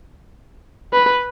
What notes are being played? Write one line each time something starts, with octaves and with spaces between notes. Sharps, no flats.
B4